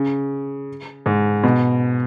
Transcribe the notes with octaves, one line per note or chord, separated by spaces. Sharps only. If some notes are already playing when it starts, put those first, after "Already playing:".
Already playing: C#3
G#2
B2